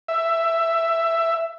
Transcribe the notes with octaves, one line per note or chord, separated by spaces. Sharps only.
E5